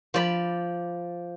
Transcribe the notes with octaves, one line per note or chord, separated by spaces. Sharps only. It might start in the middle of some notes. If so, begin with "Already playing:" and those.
F3 D5 B5